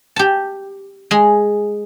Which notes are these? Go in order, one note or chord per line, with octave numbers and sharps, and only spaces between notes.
G4 A5
G#3 G#4